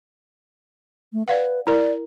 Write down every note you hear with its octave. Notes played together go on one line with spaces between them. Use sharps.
A3
B4 D5 F5 F#5
E4 A#4 D5